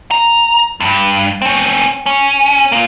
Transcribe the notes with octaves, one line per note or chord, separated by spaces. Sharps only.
A#5
E2 G2
C4 C#4
C#4
A#3 F4